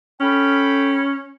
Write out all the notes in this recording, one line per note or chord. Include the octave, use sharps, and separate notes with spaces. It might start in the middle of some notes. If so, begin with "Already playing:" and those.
C#4 A4 G5 B5